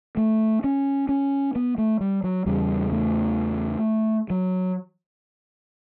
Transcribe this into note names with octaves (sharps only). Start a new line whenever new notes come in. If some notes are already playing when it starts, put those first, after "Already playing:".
A3
C#4
C#4
B3
A3
G3
F#3
E2 C#3 G3
A3
F#3